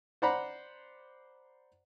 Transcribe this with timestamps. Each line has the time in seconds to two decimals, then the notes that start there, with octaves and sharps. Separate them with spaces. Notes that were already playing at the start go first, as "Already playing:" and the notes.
0.22 C5 D5 F#5 A#5 B5